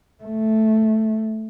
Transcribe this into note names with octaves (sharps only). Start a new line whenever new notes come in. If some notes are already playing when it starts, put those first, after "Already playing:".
A3